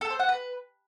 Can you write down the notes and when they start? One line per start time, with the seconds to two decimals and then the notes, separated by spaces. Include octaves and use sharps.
0.01 A4
0.10 C5
0.19 F#5
0.29 B4